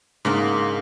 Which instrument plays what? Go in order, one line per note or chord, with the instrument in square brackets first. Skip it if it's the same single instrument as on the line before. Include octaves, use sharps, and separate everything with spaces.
[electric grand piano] G#2 [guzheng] C#3 A#3 D4